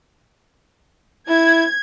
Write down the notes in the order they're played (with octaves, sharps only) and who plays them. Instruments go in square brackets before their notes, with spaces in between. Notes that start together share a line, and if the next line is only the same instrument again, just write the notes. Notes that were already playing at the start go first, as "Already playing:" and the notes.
[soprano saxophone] E4 [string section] G#6